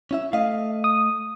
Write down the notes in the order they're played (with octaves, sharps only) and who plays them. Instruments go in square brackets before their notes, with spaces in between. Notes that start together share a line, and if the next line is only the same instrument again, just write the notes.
[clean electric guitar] C#4 E4 E5
[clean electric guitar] A3 D#5 [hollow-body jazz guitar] F5
[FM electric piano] D#6